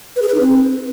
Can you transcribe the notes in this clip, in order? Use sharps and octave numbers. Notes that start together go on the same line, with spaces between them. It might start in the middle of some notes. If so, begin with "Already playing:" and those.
B4
G#4
B4
D#4
C4